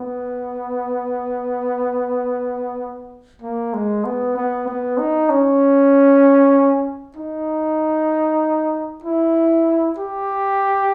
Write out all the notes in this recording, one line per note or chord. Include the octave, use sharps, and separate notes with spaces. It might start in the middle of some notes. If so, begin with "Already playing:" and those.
Already playing: B3
A#3
G#3
B3
B3
B3
D#4
C#4
D#4
E4
G4